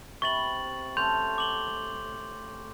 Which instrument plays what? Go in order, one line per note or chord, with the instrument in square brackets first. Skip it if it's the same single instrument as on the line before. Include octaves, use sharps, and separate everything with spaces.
[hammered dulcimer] C3 B5 [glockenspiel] C#6 A6 F#7
[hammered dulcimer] A3 C#4 [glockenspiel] C6 G6 F7
[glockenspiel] D6 F#7 G7